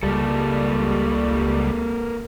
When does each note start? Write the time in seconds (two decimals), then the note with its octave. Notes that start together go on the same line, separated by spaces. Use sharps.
0.03 C#2 G3 A#3 A4